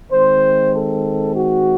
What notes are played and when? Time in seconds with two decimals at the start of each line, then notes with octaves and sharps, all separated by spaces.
0.12 D#3 G#3 C4 C5
0.73 A4
1.34 F#4